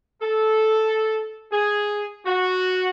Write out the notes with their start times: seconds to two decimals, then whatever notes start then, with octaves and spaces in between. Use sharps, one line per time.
0.22 A4
1.52 G#4
2.26 F#4